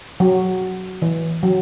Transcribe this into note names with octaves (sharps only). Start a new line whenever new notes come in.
F#3
E3
F#3